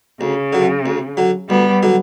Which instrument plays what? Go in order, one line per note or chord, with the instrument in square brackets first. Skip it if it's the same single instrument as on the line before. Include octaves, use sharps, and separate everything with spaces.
[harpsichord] D2 [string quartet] C#3
[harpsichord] D3 F#3
D2
D3 F#3
[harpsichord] D2 [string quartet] G3 B3
[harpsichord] D3 F#3